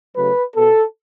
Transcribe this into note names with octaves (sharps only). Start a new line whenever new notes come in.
C#3 F#3 A3 B4
B2 B3 A4